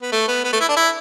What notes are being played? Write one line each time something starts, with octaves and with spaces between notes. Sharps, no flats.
B3
A3
B3
B3
A3
E4
D4
E4